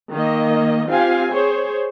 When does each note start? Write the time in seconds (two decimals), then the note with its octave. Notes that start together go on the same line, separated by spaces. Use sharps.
0.12 D#3 A#3 D#5
0.90 C4 F4 G4 F5 G#5
1.32 G#4 C5 C#5